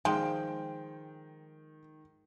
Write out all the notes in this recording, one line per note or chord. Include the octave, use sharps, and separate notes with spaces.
D#3 F3 G#3 G5 C6